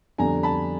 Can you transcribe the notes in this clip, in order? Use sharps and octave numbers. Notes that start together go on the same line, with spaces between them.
F2 D3 G3 B3 D4 G#5 A#5
A5 B5